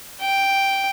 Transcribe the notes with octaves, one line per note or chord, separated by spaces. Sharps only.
G5